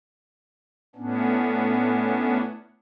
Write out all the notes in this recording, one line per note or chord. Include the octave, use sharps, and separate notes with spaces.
A2 B3 C#4 D4